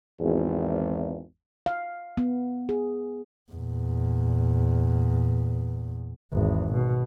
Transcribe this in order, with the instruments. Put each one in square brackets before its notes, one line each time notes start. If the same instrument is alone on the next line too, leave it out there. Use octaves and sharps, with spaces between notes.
[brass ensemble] G#1 E2
[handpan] F5
B3
G#4
[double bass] E2 A#2
G#1 E2
B2